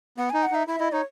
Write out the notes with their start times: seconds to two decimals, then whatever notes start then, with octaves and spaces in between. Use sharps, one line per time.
0.18 B3 F#5
0.30 D#4 G#5
0.43 F#5
0.52 D#4 E5
0.67 E4 E5
0.80 E4 D#5
0.93 D#4 C#5